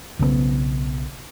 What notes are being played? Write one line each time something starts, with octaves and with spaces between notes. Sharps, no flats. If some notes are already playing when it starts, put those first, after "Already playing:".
B1 C#3 F#3 B3